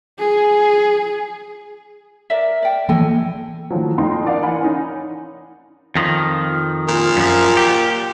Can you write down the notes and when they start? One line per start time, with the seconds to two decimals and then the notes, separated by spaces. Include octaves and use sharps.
0.19 G#4
2.30 A#4 D5 E5
2.62 D5 G5
2.89 E3 F3 A#3 A4 G5 G#5
3.70 A2 D#3 F3 F#3
3.98 F2 D#4 C6
4.24 D4 D#4 A#4 D5 F5 F#5
4.42 E3 A#4 F#5 G#5 B5
4.62 C#4 D#4
5.95 F2 D#3 F3
6.88 A#2
7.17 F#2 F3
7.57 G4